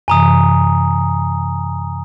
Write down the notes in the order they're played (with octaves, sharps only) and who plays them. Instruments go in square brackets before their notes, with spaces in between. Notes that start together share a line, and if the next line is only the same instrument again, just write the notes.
[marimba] F#2 C3 E3 [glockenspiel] G#5 A#5 D#6